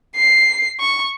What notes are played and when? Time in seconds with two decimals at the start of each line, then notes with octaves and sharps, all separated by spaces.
0.16 C7
0.80 C#6